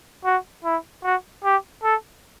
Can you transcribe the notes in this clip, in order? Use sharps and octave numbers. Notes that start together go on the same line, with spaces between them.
F#4
E4
F#4
G4
A4